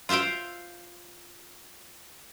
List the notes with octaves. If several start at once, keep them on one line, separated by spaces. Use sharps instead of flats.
F4 C5 E5 F5 G5